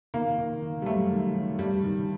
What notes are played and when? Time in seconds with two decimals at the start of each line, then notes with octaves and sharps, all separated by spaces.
0.14 D#3 A#3
0.38 D#3
0.62 D#3
0.82 G3
0.86 F#2 A3
1.11 D#3
1.35 D#3
1.59 G2 G3
1.83 D#3